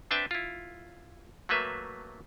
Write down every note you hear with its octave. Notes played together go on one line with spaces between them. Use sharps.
C4 D4 B4 E5 G5 A5
E4 F4
F#3 A3 A#3 B4 E5